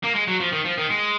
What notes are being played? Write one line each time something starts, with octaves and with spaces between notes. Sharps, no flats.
A#3
G#3
F#3
F3
D#3
F3
D#3
G#3